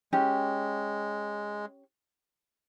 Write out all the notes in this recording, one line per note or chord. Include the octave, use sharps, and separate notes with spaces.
G#3 C#4 G4